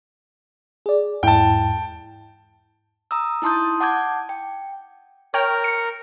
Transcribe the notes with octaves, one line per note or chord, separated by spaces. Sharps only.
G#4 D5
E2 G#2 E4 G5 A5
A#5 D#6 E6
D#4 E4 A5 C6 D#6 G6
F#5 A5 D6 G6 G#6
G5
A#4 C#5 G5 F6
C#7